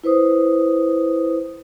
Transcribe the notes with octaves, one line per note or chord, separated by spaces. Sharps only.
E4 B4 C5 D#6